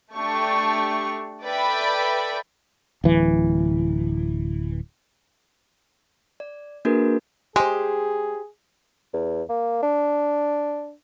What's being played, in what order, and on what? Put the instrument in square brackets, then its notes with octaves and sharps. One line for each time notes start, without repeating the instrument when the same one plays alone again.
[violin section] A3 D4 G4 C#6
A4 B4 D5 E5 G5 B5
[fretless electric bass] D1 E3
[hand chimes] D5
A#3 D4 F#4 G#4 A#4 B4
[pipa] G#3 [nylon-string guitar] G4 C5 [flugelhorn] G#4
[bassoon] E2
A#3
D4